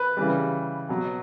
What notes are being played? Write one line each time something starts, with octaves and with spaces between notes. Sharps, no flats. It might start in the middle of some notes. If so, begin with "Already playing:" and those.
Already playing: B4
C#3 E3 G3
B2 F#3